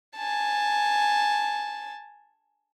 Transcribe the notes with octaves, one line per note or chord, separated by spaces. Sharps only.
G#5 A5